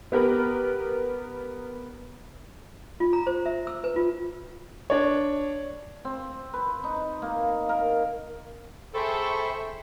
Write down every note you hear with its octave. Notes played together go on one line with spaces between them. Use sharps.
B3 G4 A#4 B4
F4
A#5
C5
E5
E6
B4
F4
D4 C#5
C4
B4
D#4
A#3
A#4
G#4 A4 C5 E5 G5 B5 C#6